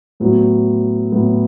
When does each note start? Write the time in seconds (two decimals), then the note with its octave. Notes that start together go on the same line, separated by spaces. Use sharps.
0.20 A2 F#3 B3
1.12 A2 F#3 B3